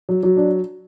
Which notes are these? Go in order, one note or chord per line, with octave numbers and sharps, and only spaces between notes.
F#3
F#3
D4